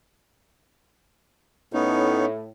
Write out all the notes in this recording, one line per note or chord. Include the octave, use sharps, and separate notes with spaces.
A2 B3 C#4 D#4